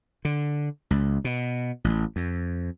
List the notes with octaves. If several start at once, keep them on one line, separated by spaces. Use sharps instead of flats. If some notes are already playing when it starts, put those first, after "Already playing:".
D3
C#2
B2
A1
F2